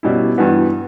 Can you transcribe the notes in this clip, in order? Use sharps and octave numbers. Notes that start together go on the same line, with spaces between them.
B2 G3 C#4 E4
G2 E3 B3 F#4